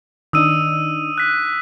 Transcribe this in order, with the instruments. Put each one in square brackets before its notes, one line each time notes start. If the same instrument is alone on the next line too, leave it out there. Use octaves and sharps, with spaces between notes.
[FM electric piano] D#3 D4 D#4 [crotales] D#6 E6 D#7
[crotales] F#6 B6